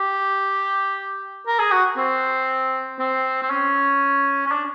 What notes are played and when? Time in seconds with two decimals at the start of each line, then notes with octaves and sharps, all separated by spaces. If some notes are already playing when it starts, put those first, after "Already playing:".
Already playing: G4
1.47 A#4
1.59 G#4
1.72 F#4
1.97 C4
2.99 C4
3.42 C4
3.50 C#4
4.46 C#4
4.51 D4